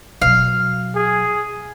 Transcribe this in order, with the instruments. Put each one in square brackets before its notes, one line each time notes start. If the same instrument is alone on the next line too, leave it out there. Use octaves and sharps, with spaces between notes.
[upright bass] B2 F#3 [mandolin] F5
[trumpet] G#4